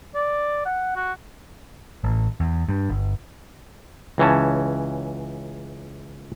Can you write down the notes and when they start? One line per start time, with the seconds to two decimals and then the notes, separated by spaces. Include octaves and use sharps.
0.15 D5
0.65 F#5
0.96 F#4
2.04 A1
2.40 E2
2.68 G2
2.89 G1
4.18 C#2 E3 C#4 A5